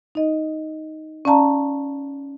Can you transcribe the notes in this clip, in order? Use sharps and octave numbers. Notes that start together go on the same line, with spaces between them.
D#4 D#5
C#4 D5 F5 A5 A#5